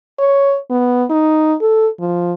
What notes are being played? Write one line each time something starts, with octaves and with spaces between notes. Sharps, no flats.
C#5
B3
D#4
A4
F3